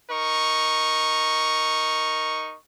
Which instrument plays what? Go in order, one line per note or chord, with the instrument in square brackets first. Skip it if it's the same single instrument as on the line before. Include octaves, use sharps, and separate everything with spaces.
[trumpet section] D#4 A#4 C#6